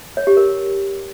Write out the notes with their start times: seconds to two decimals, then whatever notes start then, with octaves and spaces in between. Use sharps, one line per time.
0.17 C#5
0.27 G4
0.37 A#4